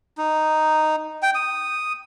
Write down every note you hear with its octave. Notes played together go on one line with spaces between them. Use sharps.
D#4
G5
D#6